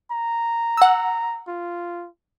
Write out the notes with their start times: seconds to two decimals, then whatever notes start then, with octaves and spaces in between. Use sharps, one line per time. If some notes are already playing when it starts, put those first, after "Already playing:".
0.11 A#5
0.77 F#5 E6
1.48 F4